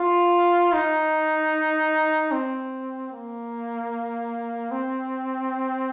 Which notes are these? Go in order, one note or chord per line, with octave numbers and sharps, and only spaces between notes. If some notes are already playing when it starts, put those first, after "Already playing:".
Already playing: F4
D#4
C4
A#3
C4